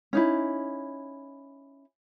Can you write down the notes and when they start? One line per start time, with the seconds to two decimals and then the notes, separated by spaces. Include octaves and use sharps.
0.13 C#4 D#4 E4